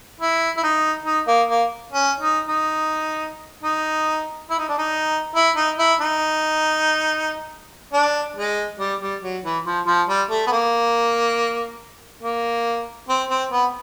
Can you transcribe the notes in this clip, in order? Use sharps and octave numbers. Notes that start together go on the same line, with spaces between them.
E4
E4
D#4
D#4
A#3
A#3
C#4
D#4
D#4
D#4
E4
D#4
D4
D#4
E4
D#4
E4
D#4
D4
G#3
G3
G3
F#3
E3
F3
F3
G3
A3
B3
A#3
A#3
C4
C4
B3